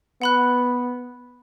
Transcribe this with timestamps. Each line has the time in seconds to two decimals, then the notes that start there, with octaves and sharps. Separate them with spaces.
0.22 B3 F#5 B5 F#6